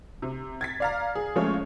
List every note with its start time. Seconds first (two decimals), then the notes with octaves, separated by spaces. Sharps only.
0.22 C3
0.61 G#6 A6 B6
0.80 D5 F5 A#5
1.15 G#4
1.36 F3 G#3 A3 C#4 F4 C#5